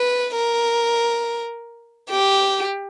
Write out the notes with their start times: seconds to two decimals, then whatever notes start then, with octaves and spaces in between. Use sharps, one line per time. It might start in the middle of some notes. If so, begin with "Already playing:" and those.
Already playing: B4
0.35 A#4
2.10 G4